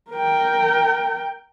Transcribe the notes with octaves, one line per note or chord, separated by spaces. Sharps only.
A#4 G5